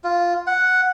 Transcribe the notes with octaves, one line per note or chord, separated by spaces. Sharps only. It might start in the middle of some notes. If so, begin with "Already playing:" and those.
F4
F#5